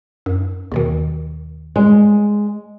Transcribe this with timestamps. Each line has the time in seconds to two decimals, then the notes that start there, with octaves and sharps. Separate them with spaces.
0.26 F#2
0.72 D#2 B2 D#3
1.76 G3 G#3